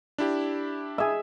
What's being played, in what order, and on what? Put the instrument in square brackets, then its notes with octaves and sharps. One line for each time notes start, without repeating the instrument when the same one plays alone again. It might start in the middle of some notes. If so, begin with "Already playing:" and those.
[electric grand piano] D4 E4 G4
[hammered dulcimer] G#4 E5